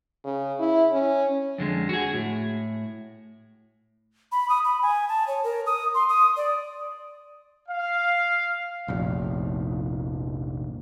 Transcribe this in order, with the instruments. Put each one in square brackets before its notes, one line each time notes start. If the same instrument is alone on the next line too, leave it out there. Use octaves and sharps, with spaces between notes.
[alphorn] C#3
E4
C#4
[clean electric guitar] F2 D3 G#3
F#4 G#4
A2
[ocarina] B5
D#6
B5
G#5
A5
C#5
A#4
D#6
C6
D#6
D5
[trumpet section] F5
[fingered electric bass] F1 A#1